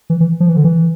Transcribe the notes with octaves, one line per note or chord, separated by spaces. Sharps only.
E3
E3
F3
E3
D3
E3